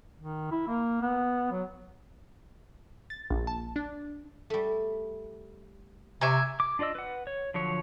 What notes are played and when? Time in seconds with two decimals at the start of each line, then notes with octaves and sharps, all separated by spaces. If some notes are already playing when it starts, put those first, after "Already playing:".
0.17 D#3
0.51 E4
0.68 A#3
1.02 B3
1.52 F#3
3.10 A6
3.30 A#1
3.47 A5
3.76 D4
4.50 G3 A3
6.21 C3 E5 G#5 A#5 C#6 D6
6.60 D6
6.79 D4 F4 D5 D#5 E6
6.95 B4 F#5
7.27 C#5
7.54 D3 F3 F#3 C#5